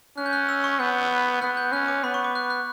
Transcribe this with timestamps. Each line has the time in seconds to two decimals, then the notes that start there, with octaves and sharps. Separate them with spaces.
0.18 C#4 F#6
0.26 G6
0.33 F#6
0.49 E6
0.64 C#6
0.80 B3 G6
1.42 B3 F#6
1.57 G6
1.72 C#4 F#6
1.88 D6
2.04 B3 B5
2.14 C#6
2.24 D6
2.35 F#6
2.50 F#6